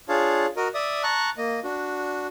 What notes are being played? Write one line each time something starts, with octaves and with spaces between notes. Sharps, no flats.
D4 F4 G#4 C#5 F5 A5
F#4 A#4 D#5
D5 E5 D#6
A5 A#5 C#6 F#6
A#3 D#5
D4 F#4